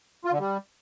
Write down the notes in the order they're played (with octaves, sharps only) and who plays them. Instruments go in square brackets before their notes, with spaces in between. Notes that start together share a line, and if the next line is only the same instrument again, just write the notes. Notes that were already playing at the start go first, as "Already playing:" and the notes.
[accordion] F4
D3
G3